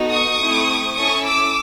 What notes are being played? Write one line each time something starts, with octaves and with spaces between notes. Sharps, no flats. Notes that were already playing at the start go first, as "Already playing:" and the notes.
Already playing: B3 D#4 F#4 A4
C#6 D#6
A3 C4 E4
C#4 E4 A4 C#6 D#6
D6 E6